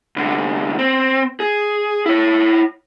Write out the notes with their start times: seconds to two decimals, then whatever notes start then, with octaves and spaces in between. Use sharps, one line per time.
0.16 C2 D3
0.79 C4
1.40 G#4
2.06 E4 C#5